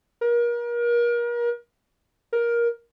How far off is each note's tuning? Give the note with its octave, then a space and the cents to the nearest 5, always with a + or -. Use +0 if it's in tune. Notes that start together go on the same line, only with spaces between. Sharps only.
A#4 +35
A#4 +15